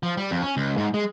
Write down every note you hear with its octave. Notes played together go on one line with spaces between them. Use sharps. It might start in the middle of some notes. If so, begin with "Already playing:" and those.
F3
G3
F2
C#4
C#2
G#2
G#3